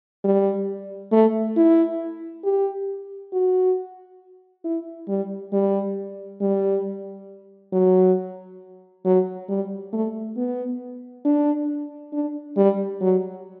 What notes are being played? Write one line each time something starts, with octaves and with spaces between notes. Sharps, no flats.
G3
A3
E4
G4
F#4
E4
G3
G3
G3
F#3
F#3
G3
A3
B3
D4
D4
G3
F#3